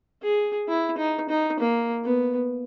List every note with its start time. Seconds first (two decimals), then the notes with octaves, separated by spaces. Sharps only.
0.22 G#4
0.68 E4
0.98 D#4
1.29 D#4
1.59 A#3
2.04 B3